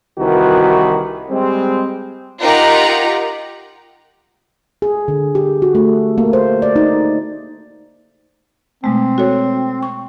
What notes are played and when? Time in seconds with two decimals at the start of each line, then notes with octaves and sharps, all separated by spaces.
0.19 C2 D#3 E3 F#4 B4
1.31 G3 G#3 C4
2.41 D#4 F4 G4 A#4 F#5 A#5
4.82 G#4
5.08 D3
5.35 G4
5.62 F#4
5.75 A3
6.18 A#3
6.33 C5
6.62 D5
6.76 D#4
8.84 B2 G#3 A3 C4
9.18 F#4 A4 C#5
9.83 C#6